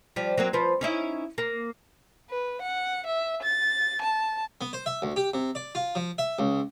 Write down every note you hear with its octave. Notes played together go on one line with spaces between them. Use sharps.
F3 G3
F#3 A#3 C4
F3 B4 C5
C#4 D#4 E4
A#3
B4
F#5
E5
A6
A5
B3
C5
E5
D2
G4
C3
D5
F4
F3
E5
C#2